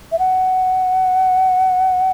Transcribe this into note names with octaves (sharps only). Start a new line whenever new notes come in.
E5
F#5